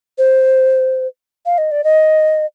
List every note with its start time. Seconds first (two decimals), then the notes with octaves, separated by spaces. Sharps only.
0.18 C5
1.46 F5
1.58 D#5
1.71 D5
1.84 D#5